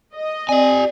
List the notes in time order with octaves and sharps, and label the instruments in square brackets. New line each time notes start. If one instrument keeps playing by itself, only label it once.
[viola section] D#5
[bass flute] C4 [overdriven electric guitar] G4 G#5 [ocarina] D5